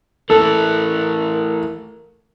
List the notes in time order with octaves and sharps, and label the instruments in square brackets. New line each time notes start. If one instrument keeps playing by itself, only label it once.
[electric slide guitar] E3 A3 [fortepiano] A4 [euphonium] A#4